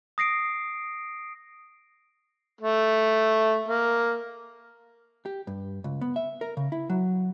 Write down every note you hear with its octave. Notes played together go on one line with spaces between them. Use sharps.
D#6 A#6 C7 D7
A3
A#3
G4
G2
C#2
B3
E5
A#4
C#3
E4
F#3